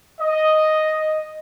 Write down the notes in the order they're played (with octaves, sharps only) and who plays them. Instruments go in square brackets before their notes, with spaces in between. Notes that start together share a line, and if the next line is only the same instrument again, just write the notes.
[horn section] D#5